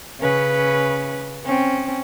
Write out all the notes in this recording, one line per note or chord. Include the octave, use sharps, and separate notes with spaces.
C#3 C#4 B4
C4 C#4